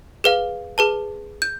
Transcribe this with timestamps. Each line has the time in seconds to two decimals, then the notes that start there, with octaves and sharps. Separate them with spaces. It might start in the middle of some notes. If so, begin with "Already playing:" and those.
0.24 G#4 B4 F5
0.78 G#4 B4 A5
1.42 G6